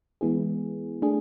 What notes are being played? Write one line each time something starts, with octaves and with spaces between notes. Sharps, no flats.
E3 G#3 B3 E4 G#4
A3 D4 G#4